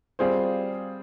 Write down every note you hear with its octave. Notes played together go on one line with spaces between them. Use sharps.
G3 C4 F4 G#4 C5